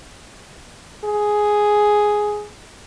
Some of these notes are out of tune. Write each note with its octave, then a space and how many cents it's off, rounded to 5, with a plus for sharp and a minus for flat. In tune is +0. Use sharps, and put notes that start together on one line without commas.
G#4 +5